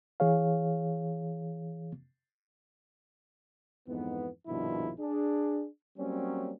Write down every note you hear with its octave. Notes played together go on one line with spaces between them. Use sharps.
E3 G#4 C#5 F5
F2 G#2 E3 B3
A#1 G2 B2 D#3 F3 E4
D4 G#4
F#3 G3 A#3 C4 C#4